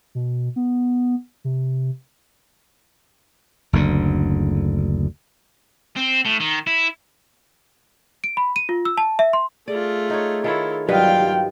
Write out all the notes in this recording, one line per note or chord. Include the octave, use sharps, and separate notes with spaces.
B2
B3
C3
F#1 D2 D3
C4
A2
D#3
E4
D7
B5
D#7
F4
E6
A5
E5
C6
A3 F4 G#4 D5
D#4 C#5
D#3 E4 F4 A4 C#5
G2 F#3 F4 B4 D#5 F5 G5
G4